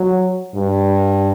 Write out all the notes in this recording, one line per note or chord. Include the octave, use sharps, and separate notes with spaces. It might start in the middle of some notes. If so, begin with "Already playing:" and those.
Already playing: F#3
G2